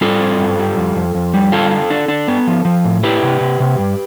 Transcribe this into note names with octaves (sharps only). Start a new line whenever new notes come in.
G3 F4 A4
C4
G2
G3
F2
F2
F2
G3
D3 F4 A4
F4
D4
D4
B3
F3
F3
A2
E4 G4 B4
C3
C3
C3
G2